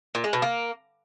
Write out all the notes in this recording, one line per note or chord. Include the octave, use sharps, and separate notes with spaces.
A#2
G#3
B2
A#3